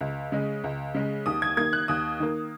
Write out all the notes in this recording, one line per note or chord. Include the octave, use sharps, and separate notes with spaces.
C#2
C#3 G#3
C#2
C#3 G#3
D#2 D#6
G#6
D#3 A#3 G#6
F#6
D#2 D#6
D#3 A#3